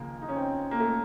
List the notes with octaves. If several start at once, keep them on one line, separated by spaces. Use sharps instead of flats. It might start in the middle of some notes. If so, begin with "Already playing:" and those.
Already playing: D#2 C#3 F3 A#3
D#4
C#4
C4
A#3
A3